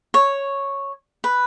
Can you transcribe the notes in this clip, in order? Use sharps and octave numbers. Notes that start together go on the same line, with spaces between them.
C#5
B4